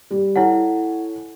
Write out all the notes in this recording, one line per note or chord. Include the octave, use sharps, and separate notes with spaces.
G3 G4
E4 A4 C#5 F#5 G#5